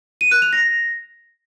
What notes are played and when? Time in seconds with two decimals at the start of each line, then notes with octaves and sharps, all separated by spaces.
0.21 D#7
0.31 F#6
0.42 F7
0.53 A#6